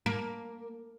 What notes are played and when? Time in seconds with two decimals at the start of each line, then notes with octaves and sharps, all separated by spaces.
0.06 A#3